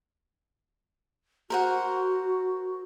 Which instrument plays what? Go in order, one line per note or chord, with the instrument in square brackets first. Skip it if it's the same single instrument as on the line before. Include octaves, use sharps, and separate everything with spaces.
[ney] F#4 [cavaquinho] A#4 C5 F#5